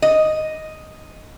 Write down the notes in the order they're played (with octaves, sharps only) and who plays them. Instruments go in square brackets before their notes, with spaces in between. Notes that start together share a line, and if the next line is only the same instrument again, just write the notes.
[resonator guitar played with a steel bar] D#5